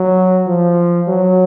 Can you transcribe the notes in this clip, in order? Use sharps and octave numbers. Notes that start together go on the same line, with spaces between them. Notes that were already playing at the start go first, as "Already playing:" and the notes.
Already playing: F#3
F3
F#3